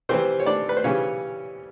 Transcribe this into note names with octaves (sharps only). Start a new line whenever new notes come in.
C3 E3 G3 C4 C5
C#5
D4 D5
B4
C5
C#3 E3 G3 C#4 C#5